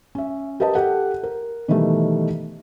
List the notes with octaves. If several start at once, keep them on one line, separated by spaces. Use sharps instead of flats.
C#4 E5
G4 A#4 B4 D#5 A5
G4 A4 F#5
A#4
B2 D#3 E3 G3 A3